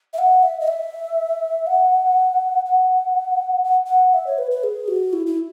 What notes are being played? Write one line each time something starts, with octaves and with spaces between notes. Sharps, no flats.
E5
F#5
E5
D#5
E5
F#5
F#5
F#5
F#5
E5
C#5
B4
B4
G#4
F#4
E4
E4